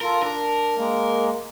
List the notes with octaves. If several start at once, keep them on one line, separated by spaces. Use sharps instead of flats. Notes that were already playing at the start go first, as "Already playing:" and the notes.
F4 A4 A#4
D4 A#4
G#3 A#3